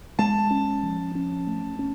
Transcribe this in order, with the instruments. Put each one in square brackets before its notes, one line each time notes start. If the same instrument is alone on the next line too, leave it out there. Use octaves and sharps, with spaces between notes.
[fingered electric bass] G#3 [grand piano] A5
[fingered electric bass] C#4
F3
C#4
A3
C#4